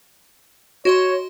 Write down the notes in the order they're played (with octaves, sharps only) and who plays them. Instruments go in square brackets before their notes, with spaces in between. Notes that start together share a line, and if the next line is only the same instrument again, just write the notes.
[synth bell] F#4 D#5 C6 [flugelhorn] C#5